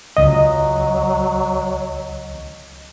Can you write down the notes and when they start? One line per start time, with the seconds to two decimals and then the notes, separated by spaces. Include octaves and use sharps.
0.17 C#2 F#3 D#5